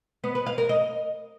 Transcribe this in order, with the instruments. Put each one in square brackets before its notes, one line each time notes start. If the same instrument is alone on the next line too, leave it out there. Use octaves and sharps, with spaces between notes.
[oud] B3
B4
F5
A#4
D#5